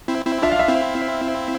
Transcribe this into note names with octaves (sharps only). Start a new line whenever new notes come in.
C4 E4
C4 E4
D4 F4 E5
F5
E5
C4 E4